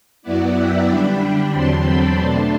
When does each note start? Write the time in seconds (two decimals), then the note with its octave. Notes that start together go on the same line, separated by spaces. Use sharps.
0.22 F#2 F#3 B3 E4 D5 F#5
0.55 E5 G5
0.87 D3 G3 D4 G5 B5
1.52 E2 D3 F#3 C4 A5 C6
1.84 G5 B5
2.16 B2 A3 D4 A5 C6